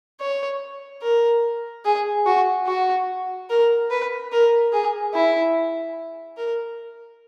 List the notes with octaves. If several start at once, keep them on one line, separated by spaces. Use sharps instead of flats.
C#5
A#4
G#4
F#4
F#4
A#4
B4
A#4
G#4
E4
A#4